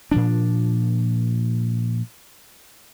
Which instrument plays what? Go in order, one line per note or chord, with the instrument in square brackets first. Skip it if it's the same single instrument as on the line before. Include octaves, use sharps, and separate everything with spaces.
[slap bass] A#2 F3 D4